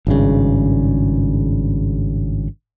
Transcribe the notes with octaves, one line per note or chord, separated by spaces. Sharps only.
G#1 G2 C#3